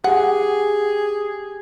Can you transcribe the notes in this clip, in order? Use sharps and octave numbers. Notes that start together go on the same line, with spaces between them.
G4 G#4 F#5